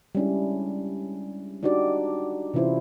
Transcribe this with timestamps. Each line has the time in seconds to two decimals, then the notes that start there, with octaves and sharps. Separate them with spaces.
0.15 G3 G#3 C#4 D4 E4
1.63 D4 D#4 F#4 G4 D5
2.54 C3 E3 C#4 E4 F4 C5